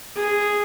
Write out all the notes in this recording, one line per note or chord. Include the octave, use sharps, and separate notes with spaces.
G#4